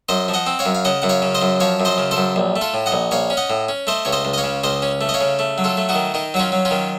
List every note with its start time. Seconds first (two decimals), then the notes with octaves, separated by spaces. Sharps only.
0.09 F#2 C5 D#5
0.28 F3
0.34 D#5 F#5
0.46 C4
0.59 C#5 F5
0.65 F#2
0.75 F5
0.85 C#3 D#5 F#5
1.02 F#2 F#5
1.09 C#5 F5
1.22 C#3
1.35 C5 D#5
1.42 F#2
1.60 F3 C#5 F5
1.80 F#2
1.85 C5 D#5
1.98 C#3
2.11 A4 C5
2.17 F#2
2.36 A#1
2.56 A3
2.61 F4 A4
2.74 A2
2.86 D#5 F#5
2.92 A#1
3.11 A#1 C#5 F5
3.30 C#4
3.37 D#5 F#5
3.50 A2
3.68 C#4
3.87 A3 C5 D#5
4.05 C#2 C#5
4.12 C5 D#5
4.25 C#2
4.33 D#5
4.38 C#5 F5
4.44 C#3
4.63 C#2 C5 D#5
4.82 C#4
5.01 A3
5.09 D#5
5.14 C#5 F5
5.21 C#3
5.39 A3
5.58 F#3
5.64 F4 A4
5.77 A3
5.89 D#4 F#4
5.95 D#3
6.14 D#3 D#4
6.34 F#3 F#4
6.40 C#4 F4
6.52 F#3
6.65 C#4 F4
6.71 D#3